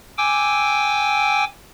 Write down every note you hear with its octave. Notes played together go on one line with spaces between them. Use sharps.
G5 G#5 D6 E6